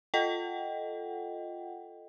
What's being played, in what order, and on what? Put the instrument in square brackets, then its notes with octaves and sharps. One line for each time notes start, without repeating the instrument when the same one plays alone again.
[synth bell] F4 A4 D#5 F#5 G5